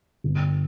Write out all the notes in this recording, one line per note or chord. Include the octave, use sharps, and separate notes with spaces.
G1